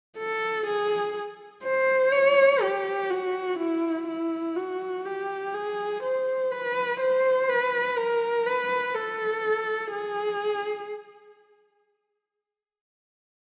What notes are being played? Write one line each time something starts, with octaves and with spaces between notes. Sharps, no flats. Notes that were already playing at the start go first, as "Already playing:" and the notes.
A4
G#4
C5
C#5
G4
F#4
E4
E4
F#4
G4
G#4
C5
B4
C5
B4
A#4
B4
A4
G#4